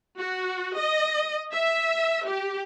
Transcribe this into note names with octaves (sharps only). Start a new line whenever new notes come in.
F#4
D#5
E5
G4